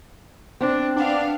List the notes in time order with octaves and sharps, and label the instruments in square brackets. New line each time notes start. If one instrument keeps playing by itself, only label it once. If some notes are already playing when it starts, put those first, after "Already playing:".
[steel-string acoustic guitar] C4 [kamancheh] D4
[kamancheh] B3 F5 [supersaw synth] D4